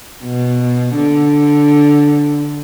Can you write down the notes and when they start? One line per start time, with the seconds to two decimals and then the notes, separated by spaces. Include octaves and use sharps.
0.24 B2
0.95 D3